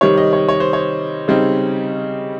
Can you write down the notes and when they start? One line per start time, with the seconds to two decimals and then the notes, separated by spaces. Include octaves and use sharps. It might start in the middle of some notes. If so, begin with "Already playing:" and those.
0.01 C3 D#3 G3 C#5
0.17 D#5
0.33 C#5
0.49 C#5
0.60 C5
0.73 C#5
1.28 C#3 G3 C4 D#4